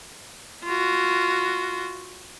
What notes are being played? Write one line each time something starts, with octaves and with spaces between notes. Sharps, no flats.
F4 F#4